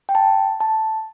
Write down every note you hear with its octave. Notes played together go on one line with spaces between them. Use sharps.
G5
A5
A5